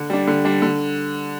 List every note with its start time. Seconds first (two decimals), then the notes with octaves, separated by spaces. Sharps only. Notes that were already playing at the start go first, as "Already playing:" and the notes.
Already playing: D3
0.10 G3 D4
0.28 D3
0.45 G3 D4
0.62 D3